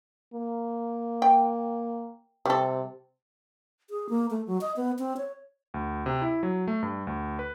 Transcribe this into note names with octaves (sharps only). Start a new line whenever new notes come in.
A#3
G5
C3 G3 A4
G#4
A#3
A3
F#3
D#5
B3
C4
C#5
D2
C3
E4
F#3
A3
G2
D2
B4